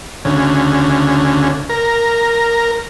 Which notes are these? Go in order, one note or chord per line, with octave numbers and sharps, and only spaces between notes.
D2 C#3
A#4